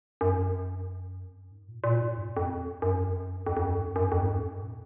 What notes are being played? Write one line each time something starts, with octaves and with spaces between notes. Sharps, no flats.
F#2
F2
F#2
G#2
A#2
A#2
G#2
F2
F2
F#2
F2
F2
F#2
G#2
F#2
F2
G#2
F#2
G#2
A#2